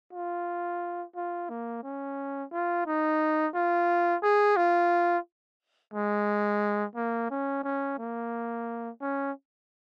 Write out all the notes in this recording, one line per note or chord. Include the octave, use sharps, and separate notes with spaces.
F4
F4
A#3
C#4
F4
D#4
F4
G#4
F4
G#3
A#3
C#4
C#4
A#3
C#4